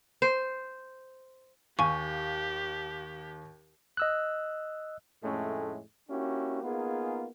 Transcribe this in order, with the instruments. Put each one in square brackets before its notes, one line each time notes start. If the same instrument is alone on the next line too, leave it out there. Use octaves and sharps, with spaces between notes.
[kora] C5
[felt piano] D#2 F5 [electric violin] G4 [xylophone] G#5 C#6
[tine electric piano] D#5 E6 F#6
[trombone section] F2 A2 G#3 A3 C#4
A#3 C#4 D4 E4 F#4 G4
A#3 B3 D#4 F4 G#4